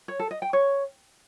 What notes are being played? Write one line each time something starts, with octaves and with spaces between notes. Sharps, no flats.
C#5
A4
D#5
G5
C#5